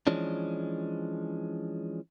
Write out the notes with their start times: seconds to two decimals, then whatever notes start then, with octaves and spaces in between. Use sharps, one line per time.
0.07 E3 F3 G#3 C#4 D4